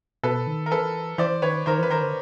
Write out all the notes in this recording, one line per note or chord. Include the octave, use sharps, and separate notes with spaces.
B2 A4 B4
D#3
A#4
E3 A4 B4
E3 C5 D5
D#3 B4 C#5
D#3 A#4 C5
E3 B4
D#3 A#4 C5
D3